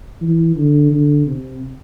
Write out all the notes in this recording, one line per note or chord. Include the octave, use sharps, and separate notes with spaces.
E3
D3
D3
C3